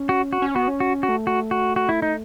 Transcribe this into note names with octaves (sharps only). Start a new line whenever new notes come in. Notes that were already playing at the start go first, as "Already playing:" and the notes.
Already playing: C#4
F#4
F#4
C#4
B3 F#4
C#4
F#4
F#4
A3
F#4
F#4
F#4
E4
D#4